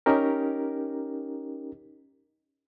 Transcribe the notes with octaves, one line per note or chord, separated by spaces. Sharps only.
C#4 D#4 G4 A#4